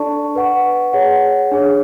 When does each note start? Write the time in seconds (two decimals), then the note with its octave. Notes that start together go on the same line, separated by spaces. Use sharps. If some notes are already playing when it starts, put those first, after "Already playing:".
Already playing: D4 A4 D5 A5 C#6
0.35 B4 F#5 C#6
0.93 G#4 C#5 F#5
1.51 D4 G#4 C#5